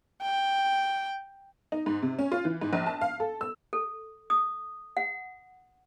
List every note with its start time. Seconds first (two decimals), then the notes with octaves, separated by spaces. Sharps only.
0.22 G5
1.72 D#4
1.86 G#2
2.02 C3
2.19 C#4
2.32 F4
2.45 E3
2.61 G#2
2.73 A#1
2.86 A5
3.01 F5
3.20 A4
3.41 E6
3.73 A4
4.30 D#6
4.97 F#5